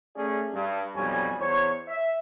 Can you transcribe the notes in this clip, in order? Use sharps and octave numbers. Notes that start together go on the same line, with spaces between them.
A3 C#4 G#4 D5
G2
B1 F2 G3 C#5 G#5
E2 C5 C#5
E5